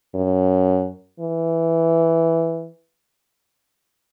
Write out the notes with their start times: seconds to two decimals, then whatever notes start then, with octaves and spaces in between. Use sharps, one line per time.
0.14 F#2
1.20 E3